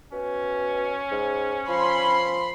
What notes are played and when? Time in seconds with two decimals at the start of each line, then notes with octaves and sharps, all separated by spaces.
0.12 B2 C#4
1.12 G#2
1.69 F3 B5 C6